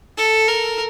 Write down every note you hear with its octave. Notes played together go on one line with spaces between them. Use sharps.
A4
A#4